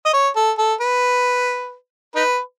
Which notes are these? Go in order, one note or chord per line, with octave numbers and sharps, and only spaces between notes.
D#5
C#5
A4
A4
B4
D#4 B4